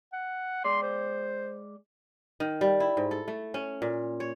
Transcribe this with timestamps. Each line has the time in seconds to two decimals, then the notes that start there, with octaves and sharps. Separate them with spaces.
0.13 F#5
0.65 G#3 D5 C6
0.82 C5
2.40 D#3
2.61 G3
2.80 E4
2.97 G#2
3.11 A4
3.28 A3
3.54 C#4
3.82 A#2
4.20 C#5